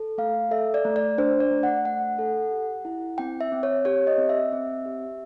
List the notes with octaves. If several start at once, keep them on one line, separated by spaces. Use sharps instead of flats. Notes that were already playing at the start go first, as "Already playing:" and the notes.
Already playing: A4
A3 F5
A4 E5
D5
A3
D5
D4 C5
D5
A3
F#5
A3 F#5
A4
G4
E4
C4 G5
E5
C4
C#5
G4 C#5
D#5
C4
E5
C4
G4